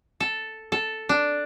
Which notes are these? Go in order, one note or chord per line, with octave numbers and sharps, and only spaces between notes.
A4
A4
D4